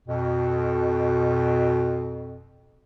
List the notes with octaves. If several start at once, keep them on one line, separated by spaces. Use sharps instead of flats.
F2 B2